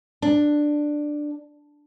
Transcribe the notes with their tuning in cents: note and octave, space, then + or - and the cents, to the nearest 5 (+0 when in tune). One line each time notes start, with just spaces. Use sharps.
D4 +10